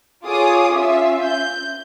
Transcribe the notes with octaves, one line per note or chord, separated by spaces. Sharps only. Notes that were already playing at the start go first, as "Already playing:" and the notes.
F4 G#4 C#5 D6 D#6
C#4 F4 E5
G6